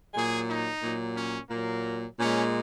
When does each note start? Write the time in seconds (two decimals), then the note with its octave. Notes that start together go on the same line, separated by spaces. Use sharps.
0.13 A#2 F#3 G#4
0.48 D#4
0.81 A#2 F#3
1.16 C#4
1.50 A#2 F#3 A#3
2.19 A#2 G#3 C#4